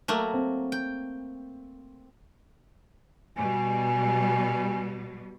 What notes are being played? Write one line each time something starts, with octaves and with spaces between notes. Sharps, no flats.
F#3 A3 A#3
C4
G5
B2 G3 G#5